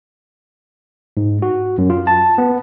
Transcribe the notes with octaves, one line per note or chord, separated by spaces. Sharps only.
G#2
F#4
F#2
F4
A5
B3